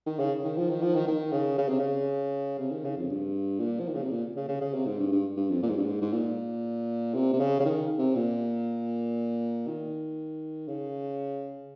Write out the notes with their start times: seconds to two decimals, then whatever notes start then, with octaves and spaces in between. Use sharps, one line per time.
0.06 D#3
0.19 C#3
0.44 D#3
0.57 F3
0.70 D#3
0.82 F3
0.95 D#3
1.08 D#3
1.33 C#3
1.58 C#3
1.69 C3
1.79 C#3
2.59 C3
2.72 D#3
2.85 C#3
2.97 F2
3.10 G2
3.60 A#2
3.80 F3
3.88 D#3
3.95 C#3
4.03 C3
4.11 A#2
4.36 C#3
4.48 C#3
4.61 C#3
4.74 C3
4.86 G#2
4.99 G2
5.12 G2
5.37 G2
5.50 F2
5.63 A#2
5.69 G#2
5.77 G2
5.85 G#2
6.02 G#2
6.13 A#2
7.14 C3
7.33 C3
7.40 C#3
7.60 C#3
7.65 D#3
7.98 C3
8.15 A#2
9.67 D#3
10.68 C#3